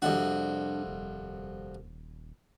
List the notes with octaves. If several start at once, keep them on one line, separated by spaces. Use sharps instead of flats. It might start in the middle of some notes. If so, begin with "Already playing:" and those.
C2 F2 D4 F#4
D#1